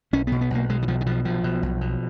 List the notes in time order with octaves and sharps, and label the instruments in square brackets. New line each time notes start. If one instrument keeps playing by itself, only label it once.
[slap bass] B1 C#4
B2 B3
B3
B1 A#3
B2 G#3
D#3
B1 F3
D#3
B2 F3
B1 F3
B2
B1
B2